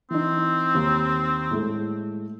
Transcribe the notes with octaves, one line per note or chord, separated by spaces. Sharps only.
E3 C4 D#4
D#2
A2 G#3 A3